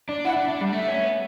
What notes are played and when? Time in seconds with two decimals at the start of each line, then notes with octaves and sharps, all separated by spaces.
0.09 D4
0.25 E4 F#5
0.36 D4
0.41 E5
0.48 D4
0.56 F#5
0.61 G3
0.72 A3 E5
0.88 C#4
1.04 B3